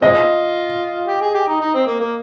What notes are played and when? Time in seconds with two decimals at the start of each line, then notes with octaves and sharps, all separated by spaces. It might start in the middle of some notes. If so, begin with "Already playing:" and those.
0.02 G#3 C4 F4 D#5
1.08 G4
1.22 G#4
1.35 G4
1.48 D#4
1.61 D#4
1.74 C4
1.87 A#3
2.00 A#3